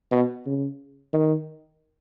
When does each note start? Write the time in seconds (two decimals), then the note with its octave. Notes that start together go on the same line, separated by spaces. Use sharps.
0.12 B2
0.46 C#3
1.13 D#3